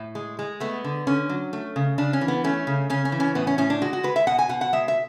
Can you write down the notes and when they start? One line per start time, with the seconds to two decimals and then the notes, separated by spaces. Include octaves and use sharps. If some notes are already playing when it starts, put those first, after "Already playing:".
Already playing: A2
0.15 G#3
0.39 G#3
0.60 A3 B3
0.84 D3
1.07 D3 C#4
1.29 F#3
1.53 A3
1.76 C#3
1.98 C#3 D4
2.13 C#4
2.21 E3
2.28 B3
2.44 A3 C#4
2.67 C#3
2.90 C#3 C#4
3.05 C#4
3.12 E3
3.20 C#4
3.35 A2 B3
3.47 C#4
3.58 A2 C#4
3.70 D4
3.82 G#3 F#4
3.93 F#4
4.03 G#3 B4
4.16 E5
4.27 B2 F#5
4.39 G#5
4.49 B2 F#5
4.61 F#5
4.73 G#3 E5
4.88 E5